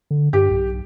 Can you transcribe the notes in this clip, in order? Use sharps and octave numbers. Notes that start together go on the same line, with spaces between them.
D3
G2 G4
B1